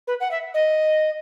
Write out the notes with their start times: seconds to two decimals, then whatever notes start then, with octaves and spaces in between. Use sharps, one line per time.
0.07 B4
0.20 F#5
0.31 E5
0.54 D#5